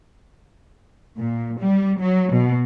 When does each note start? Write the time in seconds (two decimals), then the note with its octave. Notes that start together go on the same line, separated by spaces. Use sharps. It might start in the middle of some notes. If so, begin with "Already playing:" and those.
1.17 A#2
1.60 G3
1.99 F#3
2.32 B2